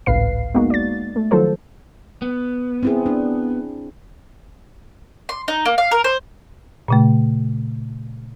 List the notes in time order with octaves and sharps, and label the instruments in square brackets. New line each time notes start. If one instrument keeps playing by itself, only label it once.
[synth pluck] G#1 C#2 A2 B4 F5 C7
G#3 A#3 B3 D#4 F#4
D5 A6
A3
D#3 F3 F#3 F4 A4 C5
[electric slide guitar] B3
[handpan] C4 E4 G#4
D4
[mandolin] C6
D#4
A#3
F5
A#4
C5
[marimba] A#2 C#3 A3